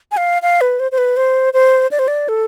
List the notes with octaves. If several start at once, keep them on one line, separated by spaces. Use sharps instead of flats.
G#5
F5
F5
B4
C5
C5
B4
C5
C5
D5
C5
D5
A4